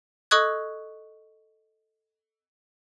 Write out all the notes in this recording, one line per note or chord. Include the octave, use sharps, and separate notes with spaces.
A4 D#5 C#6 D#6 F#6 G#6